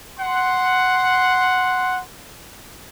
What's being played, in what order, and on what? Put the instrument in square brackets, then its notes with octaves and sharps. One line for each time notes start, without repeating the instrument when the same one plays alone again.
[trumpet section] F#5 C6